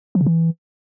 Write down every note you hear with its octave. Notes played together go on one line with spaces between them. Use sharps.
F3
C#3
E3